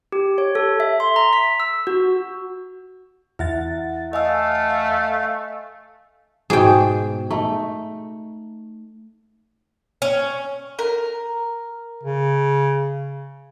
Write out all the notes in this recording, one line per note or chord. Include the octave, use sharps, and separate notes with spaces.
G4
C#5
A4
E5
C6
A#5
B6
E6
F#4
E2 E4 E5 F#5 A6
A3 D#5 F5 G#5 E6
G#2 B2 G#4 G5
A3 D#4
C#4
A#4
C#3